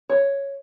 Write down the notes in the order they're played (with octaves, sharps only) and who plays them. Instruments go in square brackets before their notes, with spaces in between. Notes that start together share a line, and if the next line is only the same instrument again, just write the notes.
[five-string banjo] C#5